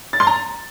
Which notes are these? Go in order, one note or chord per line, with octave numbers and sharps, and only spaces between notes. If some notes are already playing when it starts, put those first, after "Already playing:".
A6
C6
A#5